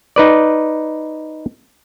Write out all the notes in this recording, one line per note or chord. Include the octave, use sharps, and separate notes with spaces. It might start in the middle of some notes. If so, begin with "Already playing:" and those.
D#4 B4 D5